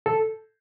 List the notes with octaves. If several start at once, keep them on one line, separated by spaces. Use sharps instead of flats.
A4